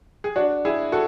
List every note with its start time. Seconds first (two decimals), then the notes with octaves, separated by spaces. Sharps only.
0.24 G#4
0.36 D4 F#4
0.65 E4 G#4
0.92 F#4 A4